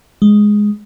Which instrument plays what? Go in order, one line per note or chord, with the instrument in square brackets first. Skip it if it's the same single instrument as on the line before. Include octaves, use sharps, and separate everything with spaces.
[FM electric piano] G#3